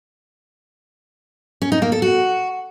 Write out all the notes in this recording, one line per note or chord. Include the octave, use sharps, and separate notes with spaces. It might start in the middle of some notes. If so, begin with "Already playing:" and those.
C#4
D#4
A#3
A4
F#4